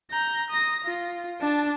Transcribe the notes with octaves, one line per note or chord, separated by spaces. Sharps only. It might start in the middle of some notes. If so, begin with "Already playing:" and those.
A#5 G6
D#6 A#6
F4
D4 A5